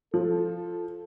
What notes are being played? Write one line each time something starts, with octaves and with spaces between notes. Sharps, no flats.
F3 A4